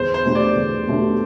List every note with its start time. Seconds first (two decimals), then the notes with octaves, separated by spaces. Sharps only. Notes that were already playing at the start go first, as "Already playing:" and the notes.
Already playing: E2 C5
0.14 C5
0.25 B2 A3 D4 G4
0.35 D5
0.56 E2
0.87 B2 A3 D4 G4